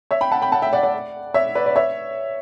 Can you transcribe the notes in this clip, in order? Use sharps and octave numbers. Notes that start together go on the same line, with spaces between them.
C#5 E5
G5 B5
F#5 A5
G5 B5
F#5 A5
E5 G5
D5 F#5
D5 F#5
C#5 E5
B4 D5
D5
C#5 E5